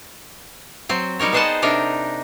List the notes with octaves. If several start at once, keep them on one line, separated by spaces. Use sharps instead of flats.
F#3 C4
G3 D#4 A#4 C#5
B3 G#4 C5 D#5 F#5 A5
C3 D4 D#4 A#4